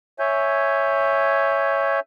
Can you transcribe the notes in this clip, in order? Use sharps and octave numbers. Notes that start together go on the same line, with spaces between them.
C#5 E5 G#5 G6